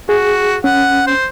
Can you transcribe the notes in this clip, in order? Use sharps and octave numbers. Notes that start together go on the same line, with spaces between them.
F#4 G#4
C#4 F#5
C5